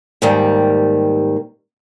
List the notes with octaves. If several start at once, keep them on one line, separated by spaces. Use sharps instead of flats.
D#2 G#2 D#3 G3